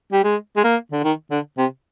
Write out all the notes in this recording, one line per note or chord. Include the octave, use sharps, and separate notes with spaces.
G3
G#3
G#3
A#3
D3
D#3
D3
C3